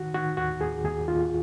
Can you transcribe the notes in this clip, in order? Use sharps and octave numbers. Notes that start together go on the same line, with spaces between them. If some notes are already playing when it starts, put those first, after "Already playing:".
Already playing: D#3 F#4
D#3 F#4
D#2 F#4
D#2 G#4
D#2 G#4
D#2 F4